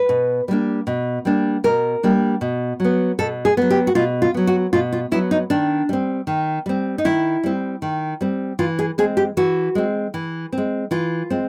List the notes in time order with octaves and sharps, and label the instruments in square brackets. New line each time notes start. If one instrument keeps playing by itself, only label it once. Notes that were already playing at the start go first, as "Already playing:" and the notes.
Already playing: [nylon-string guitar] B4
B2
G3 A#3 D4
B2
G3 A#3 D4
B2 A#4
G3 A#3 D4
B2
F#3 B3
B2 A4
G#4
F#3 B3
G4
F#4
B2 F4
F4
F#3 B3
F#4
B2 F4
F4
F#3 B3 E4
D#4
D#3 D4
G3 C4
D#3
G3 C4
D#4
D#3 E4
G3 C4
D#3
G3 C4
E3 F4
G#4
G#3 C4 G#4
G4
E3 F#4
G#3 C4
E3
C4
G#3
E3 F4
G#3 C4